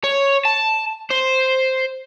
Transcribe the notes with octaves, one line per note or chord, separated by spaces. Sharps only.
C#5
A5
C5